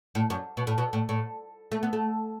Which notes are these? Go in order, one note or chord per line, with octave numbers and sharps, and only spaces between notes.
A2
F#2
B2
A2
B2
A2
A2
A3
B3
A3